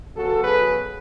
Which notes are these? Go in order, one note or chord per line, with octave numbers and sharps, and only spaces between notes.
C#3 F#3 B3 F#4 A4
G#4 B4